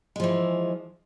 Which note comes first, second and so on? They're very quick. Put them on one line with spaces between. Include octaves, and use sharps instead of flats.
G#3 F3 E3